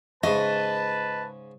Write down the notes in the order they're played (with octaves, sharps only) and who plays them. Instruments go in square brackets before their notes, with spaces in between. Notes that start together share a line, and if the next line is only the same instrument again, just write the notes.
[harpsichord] G#2 C#3 C#4 [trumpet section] B4 A5 [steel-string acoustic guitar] D#5